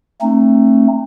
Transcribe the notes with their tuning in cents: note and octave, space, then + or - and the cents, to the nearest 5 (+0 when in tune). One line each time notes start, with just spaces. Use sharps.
A3 +15 C4 +30 D#4 -30